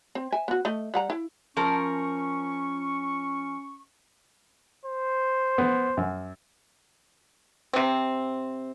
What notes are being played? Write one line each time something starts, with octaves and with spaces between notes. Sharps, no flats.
C4
E5 G#5
B3 F#4
A3 D#5
G3 F#5 A#5
E4
F3 C#4 A#4 C#6
C5
B3
F#2
C3 C4